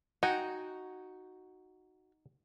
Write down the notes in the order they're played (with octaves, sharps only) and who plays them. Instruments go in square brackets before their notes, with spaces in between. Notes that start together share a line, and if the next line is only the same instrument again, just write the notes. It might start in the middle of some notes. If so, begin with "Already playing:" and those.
[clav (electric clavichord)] D#4 G5 G#5 [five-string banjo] F#4